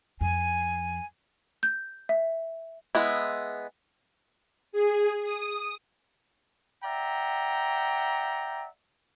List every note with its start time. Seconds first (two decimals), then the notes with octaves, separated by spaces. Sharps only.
0.21 F2 G#5
1.63 G6
2.09 E5
2.95 G#3 B3 E4
4.73 G#4
5.23 D#6
6.84 D5 E5 F#5 G5 A#5